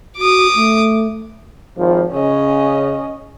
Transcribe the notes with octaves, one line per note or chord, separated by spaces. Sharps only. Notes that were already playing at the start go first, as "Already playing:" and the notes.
F#4 D6 D#6
A3
G#1 F3
C#3 C#4 D#5